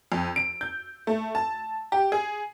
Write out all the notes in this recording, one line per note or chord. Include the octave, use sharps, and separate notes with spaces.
F2
D7
G6
A3
A5
G4
G#4